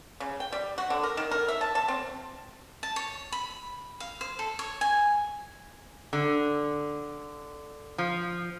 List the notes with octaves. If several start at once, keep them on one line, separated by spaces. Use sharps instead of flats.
C#3
G5
G3
F#4
D3
A#4
D#3
A#4
E5
A5
A5
C4
A5
C#5
B5
F5
C5
A4
C#5
G#5
D3
F3